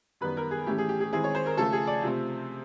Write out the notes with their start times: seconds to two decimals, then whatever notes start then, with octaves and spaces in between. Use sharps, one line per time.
0.21 F#2 D#3 G3 B3 B4
0.37 A#4
0.51 G#4
0.67 A2 E3 A3 C#4 G4
0.78 G#4
0.89 G4
1.00 G#4
1.13 D#3 G#3 C4 E4 G#4
1.24 C#5
1.35 C5
1.46 A#4
1.58 C#3 F3 A3 A4
1.72 G#4
1.87 D5
2.02 C3 F3 A3 C4